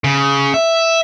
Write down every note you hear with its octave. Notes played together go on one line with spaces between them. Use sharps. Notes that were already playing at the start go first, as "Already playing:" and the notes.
C#3
E5